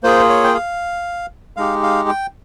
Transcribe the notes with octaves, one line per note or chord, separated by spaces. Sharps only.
A#3 F4 G#4 C5
C#5
G5
F5
G#3 D#4 G4 F5
F5
G5